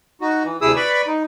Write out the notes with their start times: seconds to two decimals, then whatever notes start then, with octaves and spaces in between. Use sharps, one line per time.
0.21 D#4 F#4
0.44 E3
0.61 D2 C3 E4 G#4 D#6 E6
0.76 B4 D5 B5 C#6
1.07 D#4